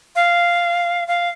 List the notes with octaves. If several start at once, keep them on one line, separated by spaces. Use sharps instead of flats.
F5
F5